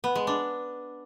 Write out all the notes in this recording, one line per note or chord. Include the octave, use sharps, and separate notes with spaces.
B3
G#3
D4